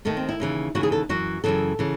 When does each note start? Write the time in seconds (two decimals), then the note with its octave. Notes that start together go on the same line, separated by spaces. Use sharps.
0.05 D#2 D#3 A3
0.17 C4
0.29 E4
0.40 D#2 C#3 E3
0.75 D#2 C#3 E3 F#4
0.83 G#4
0.92 A4
1.09 F#2 E3 F#4
1.44 F#2 C#3 E3 A4
1.79 C#3 E3